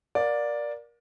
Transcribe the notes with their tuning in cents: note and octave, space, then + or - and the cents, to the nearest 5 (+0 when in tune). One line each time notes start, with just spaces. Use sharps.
A#4 +20 D5 +0 F5 +40